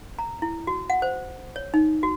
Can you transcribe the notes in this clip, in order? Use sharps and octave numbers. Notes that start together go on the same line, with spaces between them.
A#5
E4
F#4
F#5
C5
C#5
D#4
F#4